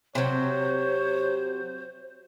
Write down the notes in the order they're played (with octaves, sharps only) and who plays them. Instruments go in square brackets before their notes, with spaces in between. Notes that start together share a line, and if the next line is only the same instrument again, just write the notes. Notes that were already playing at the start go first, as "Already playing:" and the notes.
[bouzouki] C3 F#3 [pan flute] C5 [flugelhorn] C#5